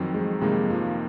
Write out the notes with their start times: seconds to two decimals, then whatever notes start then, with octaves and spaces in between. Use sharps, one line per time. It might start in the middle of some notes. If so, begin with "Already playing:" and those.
Already playing: F2 D#3 F#3 C4
0.14 G#3
0.41 F2 C3 D#3 G#3 A#3 D#4
0.70 F3